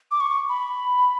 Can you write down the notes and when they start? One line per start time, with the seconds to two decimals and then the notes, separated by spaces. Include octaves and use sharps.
0.11 D6
0.20 C#6
0.49 B5